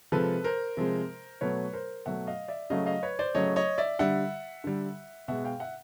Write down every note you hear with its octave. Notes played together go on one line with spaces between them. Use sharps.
C3 F3 G#3 A4 B4
A#4 C5
C3 F3 G#3
B2 F#3 A3 B4 C#5
A#4 C5
B2 F#3 A3 E5 F#5
D#5 F5
D5 E5
C#3 F#3 A3 D#5 F5
D#5 F5
B4 C#5
C5 D5
C#3 F#3 A3 C#5 D#5
C#5 D#5
D5 E5
D3 G3 E5 F#5
D3 G3
B2 G#3 E5 F#5
F5 G5
E5 F#5